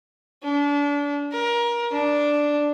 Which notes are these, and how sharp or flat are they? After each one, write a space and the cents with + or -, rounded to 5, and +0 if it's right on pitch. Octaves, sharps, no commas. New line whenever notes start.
D4 -30
A#4 +25
D4 +0